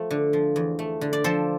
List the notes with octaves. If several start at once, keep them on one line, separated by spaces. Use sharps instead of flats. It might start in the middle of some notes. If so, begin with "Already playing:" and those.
Already playing: F3 A3
D3
F3
E2
A3
D3
D5
F3 A4 C5